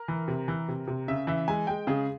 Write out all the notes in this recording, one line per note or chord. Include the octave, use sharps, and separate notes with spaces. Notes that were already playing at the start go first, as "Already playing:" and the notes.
Already playing: A#4
E3
C3
E3
C3
C3
C#3 E5
E3 E5
G#3 G#5
G#3 G5
C#3 G#4